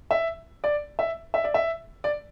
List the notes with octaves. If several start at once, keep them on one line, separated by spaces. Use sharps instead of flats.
E5
D5
E5
E5
D5
E5
D5